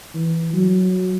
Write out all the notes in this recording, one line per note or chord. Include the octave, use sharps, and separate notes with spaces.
E3
F#3